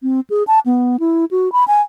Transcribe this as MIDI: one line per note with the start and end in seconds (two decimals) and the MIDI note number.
0.03 0.20 60
0.30 0.43 68
0.47 0.59 81
0.66 0.97 59
1.00 1.25 64
1.31 1.52 66
1.52 1.64 83
1.68 1.81 80